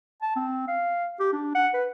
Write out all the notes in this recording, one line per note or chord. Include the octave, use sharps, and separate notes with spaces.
A5
C4
F5
G4
D4
F#5
B4